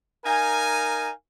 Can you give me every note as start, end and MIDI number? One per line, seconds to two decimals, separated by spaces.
0.25 1.10 63
0.25 1.10 70
0.25 1.10 77
0.25 1.10 80